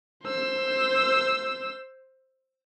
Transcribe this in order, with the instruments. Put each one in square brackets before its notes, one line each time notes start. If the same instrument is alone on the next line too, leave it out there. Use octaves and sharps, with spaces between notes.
[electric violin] C5 E6